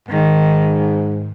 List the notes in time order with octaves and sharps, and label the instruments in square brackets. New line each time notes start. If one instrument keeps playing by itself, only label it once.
[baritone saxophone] G#2 [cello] D#3